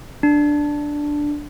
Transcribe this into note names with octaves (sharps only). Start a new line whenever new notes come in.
D4